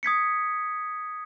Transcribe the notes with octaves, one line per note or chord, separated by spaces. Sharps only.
D#6 G#6 B6 C#7